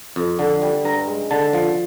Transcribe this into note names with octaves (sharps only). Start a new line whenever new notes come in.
F2
D3
G3
G2 A#5
G#3
D3 A5
F3